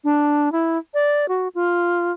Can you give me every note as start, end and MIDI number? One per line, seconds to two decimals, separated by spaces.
0.04 0.52 62
0.52 0.78 64
0.94 1.28 74
1.28 1.48 66
1.55 2.12 65